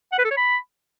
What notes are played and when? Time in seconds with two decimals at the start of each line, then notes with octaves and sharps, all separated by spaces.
0.12 F#5
0.18 B4
0.25 A4
0.31 C#5
0.37 B5